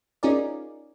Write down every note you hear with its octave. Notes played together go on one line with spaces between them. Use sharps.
C#4 D#4 F4 G#4 A#4 D5